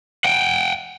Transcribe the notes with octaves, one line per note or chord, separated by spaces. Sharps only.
F#5 G5